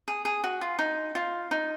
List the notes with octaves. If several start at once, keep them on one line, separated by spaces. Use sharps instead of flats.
G#4
G#4
F#4
F4
D#4
F4
D#4